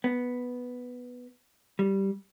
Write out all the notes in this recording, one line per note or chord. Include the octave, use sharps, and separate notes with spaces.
B3
G3